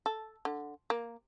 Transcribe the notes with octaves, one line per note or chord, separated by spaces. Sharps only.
A4
D3
A#3